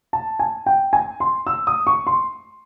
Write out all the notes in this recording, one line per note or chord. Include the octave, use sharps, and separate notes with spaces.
A5
G#5
G5
G#5
C6
E6
D#6
C#6
C6